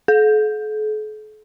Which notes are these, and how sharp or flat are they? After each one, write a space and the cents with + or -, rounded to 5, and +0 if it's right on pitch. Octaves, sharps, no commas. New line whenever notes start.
A4 -45